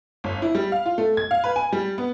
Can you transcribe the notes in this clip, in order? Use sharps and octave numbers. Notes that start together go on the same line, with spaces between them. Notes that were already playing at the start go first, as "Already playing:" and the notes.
G1
E4
G3
F5
F4
A3
G#6
F5
B4
G#5
G3
B3